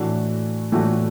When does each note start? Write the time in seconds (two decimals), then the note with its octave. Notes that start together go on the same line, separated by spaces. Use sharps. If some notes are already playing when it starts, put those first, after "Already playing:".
Already playing: A2 E3 A3 D4 F#4
0.72 A2 E3 A3 D4 F#4